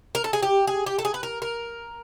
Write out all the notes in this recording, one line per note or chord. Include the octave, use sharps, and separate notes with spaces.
A#4
A4
G#4
G4
G#4
G4
A4
G#4
B4
A#4
A#4